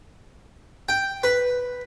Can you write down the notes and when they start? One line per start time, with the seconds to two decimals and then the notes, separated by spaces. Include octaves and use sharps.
0.89 G5
1.23 B4